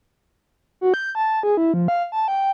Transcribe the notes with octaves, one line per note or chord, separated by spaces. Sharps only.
F#4
G6
A5
G#4
E4
F3
F5
A5
G5